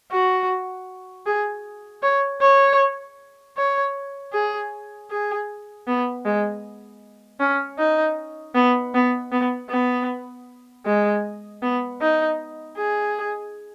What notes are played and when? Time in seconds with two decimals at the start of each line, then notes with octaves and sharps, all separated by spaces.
0.12 F#4
1.26 G#4
2.03 C#5
2.41 C#5
3.57 C#5
4.33 G#4
5.11 G#4
5.87 B3
6.25 G#3
7.40 C#4
7.79 D#4
8.55 B3
8.95 B3
9.32 B3
9.70 B3
10.86 G#3
11.63 B3
12.01 D#4
12.78 G#4